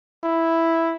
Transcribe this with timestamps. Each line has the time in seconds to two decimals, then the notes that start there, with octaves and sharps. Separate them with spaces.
0.24 E4